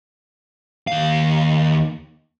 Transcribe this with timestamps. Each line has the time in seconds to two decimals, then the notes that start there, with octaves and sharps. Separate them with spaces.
0.87 D#2 F5